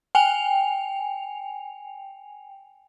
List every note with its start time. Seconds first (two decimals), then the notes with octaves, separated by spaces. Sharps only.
0.15 G5 G#5 F7